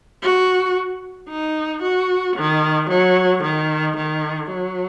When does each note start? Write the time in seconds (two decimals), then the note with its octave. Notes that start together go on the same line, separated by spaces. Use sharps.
0.22 F#4
1.29 D#4
1.82 F#4
2.36 D#3
2.90 F#3
3.43 D#3
3.97 D#3
4.50 F#3